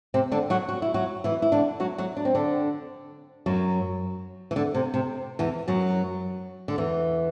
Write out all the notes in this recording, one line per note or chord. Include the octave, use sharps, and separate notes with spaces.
C3 C4
D3 D4
F#3 F#4
F#4
E4
F#3 F#4
E3 E4
E4
D3 D4
F#3 F#4
F#3 F#4
D4
C4
D3 D4
F#2 F#3
E3
D3
C3
C3
E2 E3
F#2 F#3
D3
E2 E3